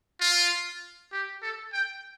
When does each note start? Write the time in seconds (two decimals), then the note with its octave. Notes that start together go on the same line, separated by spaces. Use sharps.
0.20 F4
1.12 G4
1.42 A4
1.73 G5